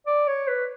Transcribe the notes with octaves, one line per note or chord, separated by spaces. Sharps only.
D5
C#5
B4